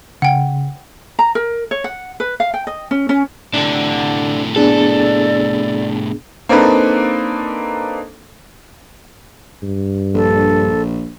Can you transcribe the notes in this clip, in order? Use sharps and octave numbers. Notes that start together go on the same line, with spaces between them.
C#3 F#5 G5
A#5
A#4
C#5
F#5
B4
F5
G5
D#5
C#4
C#4
A2 C3 D4 A4
B3 D4 G#4 A4 D5
A#3 C4 D4 D#4 A4 B4
G2
A#1 A4